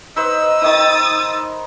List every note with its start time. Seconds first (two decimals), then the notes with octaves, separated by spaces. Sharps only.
0.16 D#4 B4 C5 D#5 E6
0.62 D#3 D#4 D#6 A6